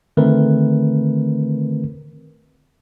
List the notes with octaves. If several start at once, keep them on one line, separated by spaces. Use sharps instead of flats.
D3 D#3 A3 C4 A#4 B4